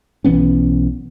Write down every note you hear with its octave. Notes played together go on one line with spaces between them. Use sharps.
B1 E3 B3 C#4